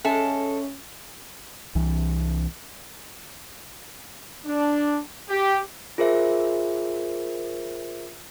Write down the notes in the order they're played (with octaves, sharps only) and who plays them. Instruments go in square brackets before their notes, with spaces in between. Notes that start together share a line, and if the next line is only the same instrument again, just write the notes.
[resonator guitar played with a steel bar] G#3 A4 [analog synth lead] C#4 [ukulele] E5 G#5
[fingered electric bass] C2 E3
[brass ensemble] D4
G4
[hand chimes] F4 G#4 A#4 C5 E5